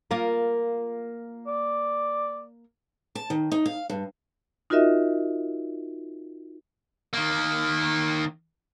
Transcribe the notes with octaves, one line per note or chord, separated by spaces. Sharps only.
A#3 F4 A#4
D5
A5
D#3
D#4
F5
G2
D#4 F4 F#4 A#4 D#5 E5
D#3 A#3